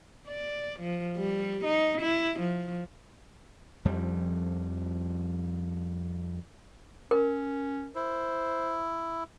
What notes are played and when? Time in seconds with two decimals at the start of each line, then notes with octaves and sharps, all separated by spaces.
0.28 D5
0.79 F3
1.17 G3
1.65 D#4
2.01 E4
2.40 F3
3.85 F2 F3 G3
7.11 C#4 A#4
7.95 E4 C5